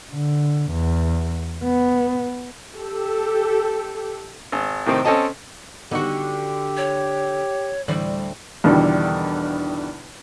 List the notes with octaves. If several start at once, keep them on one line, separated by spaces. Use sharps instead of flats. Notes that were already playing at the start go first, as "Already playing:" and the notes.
D3
E2
B3
G4 A4
G#1
A2 C3 D#3 C4
C4 C#4 A4 D#5 A5
D3 D#3 B3 D#4 F#4 G4
C#5
D2 A2 D3 E3 G3 C4 D5
E2 B2 D3 D#3 G3